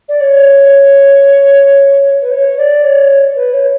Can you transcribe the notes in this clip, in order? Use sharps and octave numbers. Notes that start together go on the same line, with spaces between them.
D5
C#5
B4
C#5
D5
C#5
B4
C#5